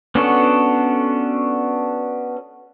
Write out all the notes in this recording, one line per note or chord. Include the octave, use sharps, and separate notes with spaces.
B3 C#4 D4 F#4 A4